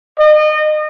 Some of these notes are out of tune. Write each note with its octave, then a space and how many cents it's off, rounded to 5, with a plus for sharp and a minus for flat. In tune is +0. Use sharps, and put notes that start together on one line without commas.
D#5 -30